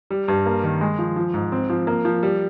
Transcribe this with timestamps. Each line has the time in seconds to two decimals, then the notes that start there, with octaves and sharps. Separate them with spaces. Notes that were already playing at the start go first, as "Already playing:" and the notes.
0.10 G3
0.28 G2
0.46 A#3
0.63 D#3
0.81 G#3
0.99 F3
1.16 F3
1.34 G#2
1.52 C4
1.70 F3
1.87 A#3
2.05 F3
2.23 G3